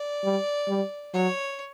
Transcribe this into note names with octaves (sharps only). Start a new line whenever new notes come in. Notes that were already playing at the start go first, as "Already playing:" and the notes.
Already playing: D5
G3
G3
F#3 C#5